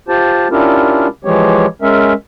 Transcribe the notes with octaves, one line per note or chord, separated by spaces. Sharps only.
F4 G4 C5 A5
C#4 D4 E4 F4 G4 A#4
E3 F3 G#3 G4 C#5
G#3 C#4 A#4 E5